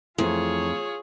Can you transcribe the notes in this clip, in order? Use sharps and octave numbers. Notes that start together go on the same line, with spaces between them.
F2 E3 A3 F4 G#4 C#5